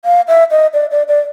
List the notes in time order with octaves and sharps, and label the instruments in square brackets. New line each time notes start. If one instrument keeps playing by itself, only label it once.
[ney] F5
E5
D#5
D5
D5
D5